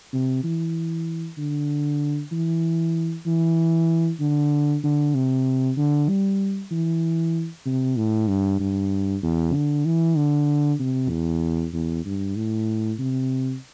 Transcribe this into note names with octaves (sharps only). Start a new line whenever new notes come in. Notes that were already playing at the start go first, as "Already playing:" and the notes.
C3
E3
D3
E3
E3
D3
D3
C3
D3
G3
E3
C3
A2
G2
G2
E2
D3
E3
D3
C3
E2
E2
G2
A2
C3